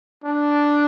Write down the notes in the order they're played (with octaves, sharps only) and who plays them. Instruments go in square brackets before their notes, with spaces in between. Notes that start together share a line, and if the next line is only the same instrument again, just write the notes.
[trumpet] D4